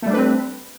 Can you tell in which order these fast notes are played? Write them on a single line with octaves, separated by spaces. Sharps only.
A3 G3 D4 B4 C4